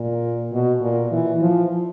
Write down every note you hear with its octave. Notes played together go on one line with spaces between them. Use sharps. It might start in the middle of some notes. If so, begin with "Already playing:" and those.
Already playing: A#2
B2
A#2
E3
F3